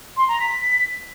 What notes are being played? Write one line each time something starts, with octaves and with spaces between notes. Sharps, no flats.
C6
A#5
B6